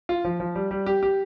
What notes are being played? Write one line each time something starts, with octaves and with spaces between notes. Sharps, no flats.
F4
F3
F3
G3
G3
G4
G4